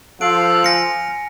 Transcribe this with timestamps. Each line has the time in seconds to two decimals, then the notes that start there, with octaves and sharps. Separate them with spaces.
0.21 F3 A4 F5 F#6 D7
0.64 G#5 F6 A#6 C#7